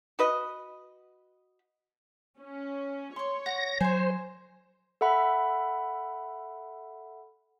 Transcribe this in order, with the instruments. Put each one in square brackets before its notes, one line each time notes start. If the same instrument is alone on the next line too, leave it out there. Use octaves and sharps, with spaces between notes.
[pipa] F#4 B4 D#5
[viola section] C#4
[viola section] C#5 [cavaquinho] C6 C#6
[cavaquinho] F#5 [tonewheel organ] A#6
[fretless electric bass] F#3 [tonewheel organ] C5 [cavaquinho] G#5 C6
[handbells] A4 E5 F#5 B5